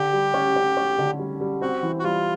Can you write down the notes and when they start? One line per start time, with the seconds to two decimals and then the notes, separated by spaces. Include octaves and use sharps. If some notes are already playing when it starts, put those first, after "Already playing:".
Already playing: D3 G4
0.13 G3
0.34 C#4
0.56 C#4
0.77 C#4
0.98 D3
1.19 G3
1.41 G3
1.61 C4 F#4
1.83 E3
1.99 F#4
2.04 G3 F4